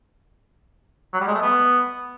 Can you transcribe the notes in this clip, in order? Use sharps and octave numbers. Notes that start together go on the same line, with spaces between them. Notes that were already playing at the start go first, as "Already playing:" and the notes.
F#3
G3
G#3
A3
B3